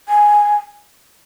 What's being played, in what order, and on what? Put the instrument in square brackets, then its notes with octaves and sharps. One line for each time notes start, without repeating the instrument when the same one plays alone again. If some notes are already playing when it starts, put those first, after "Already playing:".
[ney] G#5